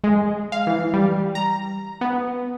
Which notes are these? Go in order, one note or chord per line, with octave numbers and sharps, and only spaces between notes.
G#3
F5
E3
G3
A#5
B3